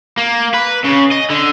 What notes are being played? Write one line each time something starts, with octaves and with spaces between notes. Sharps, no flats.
A#3
B4
C#3
D#5
D3